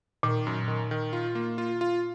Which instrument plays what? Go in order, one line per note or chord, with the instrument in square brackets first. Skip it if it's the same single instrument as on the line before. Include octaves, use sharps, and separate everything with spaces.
[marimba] A#2 [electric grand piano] D#3
[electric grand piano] F#2
D#3
D#3
F4
A#3
F4
F4